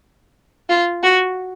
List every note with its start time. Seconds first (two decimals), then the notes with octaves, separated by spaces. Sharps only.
0.69 F4
1.03 F#4